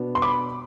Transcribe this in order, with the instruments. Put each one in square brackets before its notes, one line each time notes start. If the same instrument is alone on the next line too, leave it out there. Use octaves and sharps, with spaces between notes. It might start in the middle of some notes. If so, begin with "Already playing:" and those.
Already playing: [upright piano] B2 B3 D4
C6
B5 D6